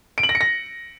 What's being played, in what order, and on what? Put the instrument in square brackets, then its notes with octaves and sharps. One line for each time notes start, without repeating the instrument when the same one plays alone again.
[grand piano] D7
F#7
A#6
C#7
A#6